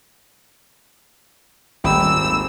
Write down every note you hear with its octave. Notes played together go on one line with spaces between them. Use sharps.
D#1 G#1 D#2 G5 B5 E6